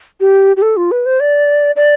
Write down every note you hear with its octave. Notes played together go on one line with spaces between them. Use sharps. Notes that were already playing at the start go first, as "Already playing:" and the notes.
G4
G4
A4
F4
B4
C5
D5
D5